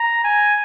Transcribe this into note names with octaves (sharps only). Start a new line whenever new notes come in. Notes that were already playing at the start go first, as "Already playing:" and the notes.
Already playing: A#5
G#5